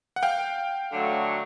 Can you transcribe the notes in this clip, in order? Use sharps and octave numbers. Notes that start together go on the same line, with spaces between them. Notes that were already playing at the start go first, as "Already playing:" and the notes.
F#5
F5 G5
D3 F#3 A3